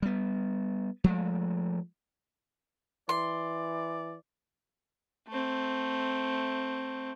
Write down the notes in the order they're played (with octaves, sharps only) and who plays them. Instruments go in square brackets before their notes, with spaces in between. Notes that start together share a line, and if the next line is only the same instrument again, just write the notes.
[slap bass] G3 B3
F3 G#3 A3
[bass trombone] E3 [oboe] D5 [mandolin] C6
[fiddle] A3 C4